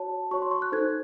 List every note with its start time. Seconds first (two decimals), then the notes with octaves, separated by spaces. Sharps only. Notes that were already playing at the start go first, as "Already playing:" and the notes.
Already playing: F#4 C#5 A5
0.31 F#4 C#5 C#6
0.42 C6
0.51 C#6
0.62 F#6
0.72 D#4 A4 C5 G#6